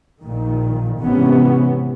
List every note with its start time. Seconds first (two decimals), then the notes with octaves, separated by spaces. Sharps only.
0.19 A#1 A#2 D#3
1.00 G#1 C3 E3 B3 C#4